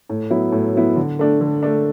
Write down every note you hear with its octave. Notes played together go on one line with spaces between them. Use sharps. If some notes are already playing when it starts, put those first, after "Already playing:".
A2
F#3 B3 E4
A2
F#3 B3 E4
D3
A3 D4
D3
A3 D4